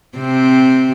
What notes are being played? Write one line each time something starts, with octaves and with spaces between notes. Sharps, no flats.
C3 C4